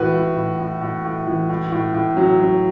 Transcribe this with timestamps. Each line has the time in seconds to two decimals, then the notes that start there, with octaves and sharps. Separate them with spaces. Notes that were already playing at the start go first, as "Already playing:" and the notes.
Already playing: A2 E3 F#4 B4
0.15 A2
0.36 A2
0.59 A2
0.81 A2
1.05 A2
1.27 E3
1.49 A2
1.72 A2
1.94 A2
2.17 F#3
2.39 F#3